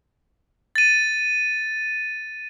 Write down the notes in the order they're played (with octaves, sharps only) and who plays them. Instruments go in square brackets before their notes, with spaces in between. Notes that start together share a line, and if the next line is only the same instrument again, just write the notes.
[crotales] A6 D#7